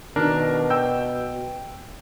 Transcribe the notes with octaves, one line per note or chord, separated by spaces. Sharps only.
B2 D#3 D4 A#4
G5 E6 G6